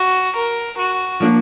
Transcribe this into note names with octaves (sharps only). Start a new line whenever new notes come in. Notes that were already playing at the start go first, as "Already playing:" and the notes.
Already playing: F#4
A#4
F#4
F3 A#3 D4 F4